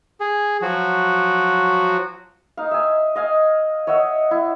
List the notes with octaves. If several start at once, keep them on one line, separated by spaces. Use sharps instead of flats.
G#4
F3 F#3 F#4
D#4 F5
E5 G#5
D#5 F5 G#5
C#5 D#5 E5 F#5
E4